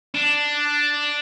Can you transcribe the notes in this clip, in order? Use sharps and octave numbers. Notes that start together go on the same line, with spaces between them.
D4